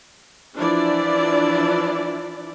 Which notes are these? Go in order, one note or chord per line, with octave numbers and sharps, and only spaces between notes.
E3 F3 D4 E4 D5